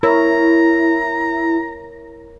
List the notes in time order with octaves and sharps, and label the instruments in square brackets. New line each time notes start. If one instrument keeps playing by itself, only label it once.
[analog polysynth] E4 [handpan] A#4 C#5 [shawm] A#5